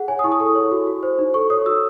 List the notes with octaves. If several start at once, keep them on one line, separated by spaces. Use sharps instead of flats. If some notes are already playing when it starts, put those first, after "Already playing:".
Already playing: G#4 F#5
C#5 G#5
D#6
E4 C#6
D#6
A4 C#6
C#5
F#4
F#4
C5
D#4
A4 C#6
C#5 D#6
F#4 E6